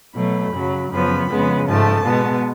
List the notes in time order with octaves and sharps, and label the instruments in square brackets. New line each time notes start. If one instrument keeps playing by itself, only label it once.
[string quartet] B2 F#3 A3 B5
F#2 C#3 F#3
F#2 C#3 F3 B3 B5
F2 C#3 G#3 B3
G#2 F3 A3 A5
B2 G#3 B3